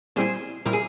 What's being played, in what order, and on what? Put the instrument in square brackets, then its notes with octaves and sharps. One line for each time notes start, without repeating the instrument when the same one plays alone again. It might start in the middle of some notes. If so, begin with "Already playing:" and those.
[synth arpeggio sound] A#2 G3 C4 E4 [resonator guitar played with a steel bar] G#4 C5
[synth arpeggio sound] A#2 G3 C4 E4 [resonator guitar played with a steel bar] A#4
[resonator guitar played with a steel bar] G#4